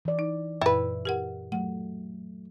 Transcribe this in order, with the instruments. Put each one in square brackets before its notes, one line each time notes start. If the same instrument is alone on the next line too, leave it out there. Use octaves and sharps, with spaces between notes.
[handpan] E3 D5
[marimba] D#4
[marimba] F#2 A#2 [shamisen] E4 B4
[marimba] G4 A#4 F#5
[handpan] F#3 A3 [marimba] F#5